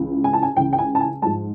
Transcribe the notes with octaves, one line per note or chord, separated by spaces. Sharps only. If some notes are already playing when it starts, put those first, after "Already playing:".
Already playing: C#2 C#3 E3
G#5
A5
G#5
C#2 C#3 E3 G5
G5
G#5
A5
G#5
G#2 F3 G#3 A5